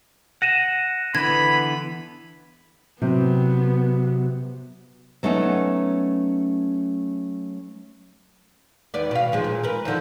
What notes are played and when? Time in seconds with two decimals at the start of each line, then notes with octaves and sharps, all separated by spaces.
0.42 F#5 A#6 D#7 E7
1.15 D3 E3 B3 B5 G#6
3.02 C3 F#3 B3
5.23 F#3 A3 B3 C#4 D#4
8.94 D#2 B3 D5
9.11 B2 F5
9.32 D#2 F3 G#3
9.44 A#2
9.63 A#4 B4
9.85 D3 D#3 F3